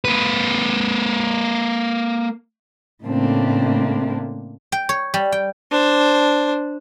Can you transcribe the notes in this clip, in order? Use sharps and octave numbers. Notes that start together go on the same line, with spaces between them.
A#3 B4
A2 C#3 A3 A#3 C4 D4
G5
C#5
G3
G5
D4 C5